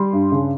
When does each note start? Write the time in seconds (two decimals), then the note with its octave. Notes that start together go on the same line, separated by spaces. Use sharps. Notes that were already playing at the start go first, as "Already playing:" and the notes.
Already playing: G3 C6
0.13 G2
0.32 C#3